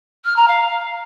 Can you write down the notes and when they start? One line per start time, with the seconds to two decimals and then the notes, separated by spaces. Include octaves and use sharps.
0.24 F6
0.36 A#5
0.48 F5